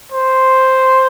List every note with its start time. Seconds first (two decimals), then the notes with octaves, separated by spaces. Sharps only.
0.12 C5